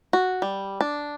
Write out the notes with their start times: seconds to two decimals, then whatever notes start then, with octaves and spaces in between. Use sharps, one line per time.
0.13 F#4
0.42 G3
0.81 D4